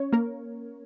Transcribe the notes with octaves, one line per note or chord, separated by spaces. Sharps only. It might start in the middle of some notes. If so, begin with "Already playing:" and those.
Already playing: C#4 C#5
A#3 A#4